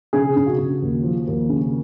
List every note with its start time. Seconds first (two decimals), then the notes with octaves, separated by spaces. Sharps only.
0.13 C#3 G#4
0.36 C#3
0.47 F#4
0.59 C#3
0.82 D#2
1.03 F3
1.27 D#2
1.49 C#3